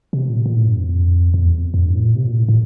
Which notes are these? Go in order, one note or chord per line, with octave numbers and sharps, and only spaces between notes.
C3
A#2
A#2
A2
G2
F2
F2
E2
F2
F2
G2
A2
A#2
C3
A#2
A2
A2